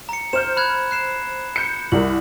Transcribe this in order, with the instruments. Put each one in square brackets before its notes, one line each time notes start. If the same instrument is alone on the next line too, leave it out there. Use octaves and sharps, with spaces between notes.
[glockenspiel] A#5 C#7
[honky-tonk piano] C5 F6 G6 [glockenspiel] E7
[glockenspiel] B5 F#6 G#6
F#6 C7 E7
[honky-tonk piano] G6 C#7
[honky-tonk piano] C2 G3 A#4 [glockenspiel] F#7